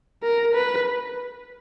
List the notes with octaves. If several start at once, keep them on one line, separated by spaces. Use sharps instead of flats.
A#4
B4